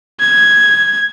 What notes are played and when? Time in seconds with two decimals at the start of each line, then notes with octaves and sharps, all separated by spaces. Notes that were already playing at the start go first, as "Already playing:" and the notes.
0.20 G#6